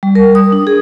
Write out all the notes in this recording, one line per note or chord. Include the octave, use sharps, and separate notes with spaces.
G3
A#4
D#6
D4
G#4